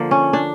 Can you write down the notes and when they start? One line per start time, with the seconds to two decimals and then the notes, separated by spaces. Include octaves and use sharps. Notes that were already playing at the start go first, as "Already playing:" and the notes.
Already playing: D3 F3 A#3
0.11 C#4
0.33 D4